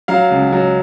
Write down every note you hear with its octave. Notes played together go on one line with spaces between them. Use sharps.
F#3 F5
C#2
F#3